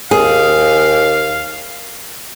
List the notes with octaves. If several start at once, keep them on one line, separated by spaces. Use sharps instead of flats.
D#2 G#4 F5